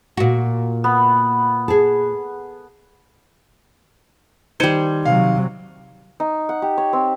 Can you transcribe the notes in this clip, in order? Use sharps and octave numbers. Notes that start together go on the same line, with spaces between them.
A#2 F#4
B3
G#4 A4
D#3 G3 D#4 C5 G#6 C#7 D#7
C3 F#3 F5
D#4
F#5
G4
C#5
C4